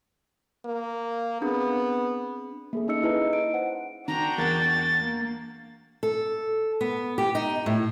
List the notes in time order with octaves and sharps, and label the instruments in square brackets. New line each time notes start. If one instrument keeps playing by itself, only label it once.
[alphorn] A#3
[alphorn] B3 [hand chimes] C4 D4 G#4
[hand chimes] A#3 G#4 A4
C#4 D#4 D#5 E6 C#7
E4 G#4 B4 D#5 A5
D7
C5 F#5
[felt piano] D#3 [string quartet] D4 F#4 G5 [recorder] A#5
[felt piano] E2 A#4 F#5 [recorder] A6
[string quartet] A#3
[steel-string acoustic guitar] A4
B3
G4
D#4
A2